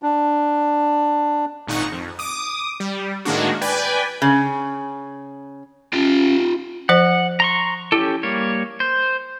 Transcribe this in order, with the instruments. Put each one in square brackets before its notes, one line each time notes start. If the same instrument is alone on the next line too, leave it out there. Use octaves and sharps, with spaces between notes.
[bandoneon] D4
[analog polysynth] G#1 A#2 D#4 F#5 C#6
F2
D6 D#6
G3
A2 D#3 G#3 A#3 D4 F#4
B4 D5 G5 G#5
[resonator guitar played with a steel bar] C#3
[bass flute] C#4 [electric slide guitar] F4 G4
[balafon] F3 C5 [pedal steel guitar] F#5
[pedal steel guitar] A#5 C6 C#6
[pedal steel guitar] C#4 G4 A4 [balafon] E4
[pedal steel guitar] G3 A#3 C#5
C5